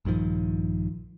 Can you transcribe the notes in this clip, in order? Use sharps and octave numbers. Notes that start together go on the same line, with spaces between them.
A#1 G2 D#3 F3